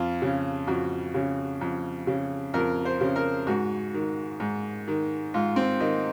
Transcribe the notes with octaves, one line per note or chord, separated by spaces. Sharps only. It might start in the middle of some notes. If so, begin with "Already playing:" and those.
Already playing: F2 F4
C#3
F2 F#4
C#3
F2
C#3
F2 A#4
C5
C#3
A#4
G#2 F#4
D#3
G#2
D#3
G#2 F4
C4
D#3 D#4